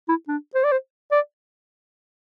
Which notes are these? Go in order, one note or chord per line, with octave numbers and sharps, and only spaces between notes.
E4
D4
C5
D5
C5
D5